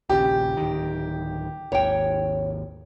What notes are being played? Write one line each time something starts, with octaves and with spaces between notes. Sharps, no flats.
A#1 D#2 C#3 G4
D1 D#3
G#1 D#2 C#5 G5